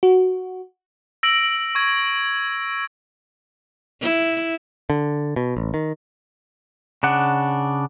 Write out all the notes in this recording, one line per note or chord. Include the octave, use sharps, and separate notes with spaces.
F#4
E6 A#6 D7 F#7
C#6 G#6
E4
D3
B2
A1
D#3
C#3 D4 F#5